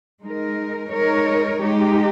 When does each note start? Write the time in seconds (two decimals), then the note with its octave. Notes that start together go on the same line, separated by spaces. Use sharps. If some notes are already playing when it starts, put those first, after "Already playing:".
0.21 G#3 D#4 A#4
0.91 G#3 D#4 A#4 C#5
1.61 G#3 D#4 G4